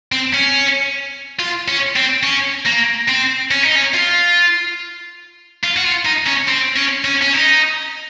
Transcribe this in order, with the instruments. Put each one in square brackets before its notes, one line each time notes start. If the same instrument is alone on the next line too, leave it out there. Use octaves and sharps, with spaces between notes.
[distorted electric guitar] C4
C#4
F4
C#4
C4
C#4
A#3
C4
C#4
D#4
C#4
F4
F4
F#4
F4
D#4
C#4
C4
C#4
C#4
C#4
D#4